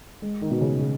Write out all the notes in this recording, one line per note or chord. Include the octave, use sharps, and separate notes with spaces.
G#3
D#3
B2
C#3
C#3